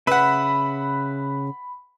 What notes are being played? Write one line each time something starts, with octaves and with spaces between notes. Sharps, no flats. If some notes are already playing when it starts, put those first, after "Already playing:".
C#3 B4 E5 F#5 B5